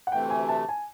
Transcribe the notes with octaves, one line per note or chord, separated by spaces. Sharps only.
F#5
D2 C3 E3 A3 G5
G#5
A5
G#5